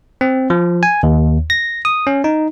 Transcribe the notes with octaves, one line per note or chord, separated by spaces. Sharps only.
C4
F3
G#5
D#2
A#6
D#6
C#4
D#4